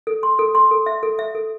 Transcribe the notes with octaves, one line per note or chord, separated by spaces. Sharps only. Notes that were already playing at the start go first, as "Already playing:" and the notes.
A4
C6
A4
C6
A4
E5
A4
E5
A4